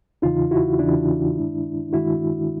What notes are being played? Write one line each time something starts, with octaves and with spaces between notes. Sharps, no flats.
E2 C#3 E3 D#4 F4
E4 F#4
E2 C#3 E3 D4 E4
G2 D#3 G#3
G2 D#3 G#3 E4 F#4